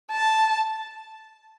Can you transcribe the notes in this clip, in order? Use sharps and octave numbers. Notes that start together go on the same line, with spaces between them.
A5